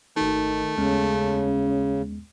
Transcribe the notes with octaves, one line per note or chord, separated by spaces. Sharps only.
G#1 D#3 A3 D#4
D#2 C#3 G#3 B3 C#4